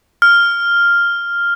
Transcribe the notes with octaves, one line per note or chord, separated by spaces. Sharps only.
F6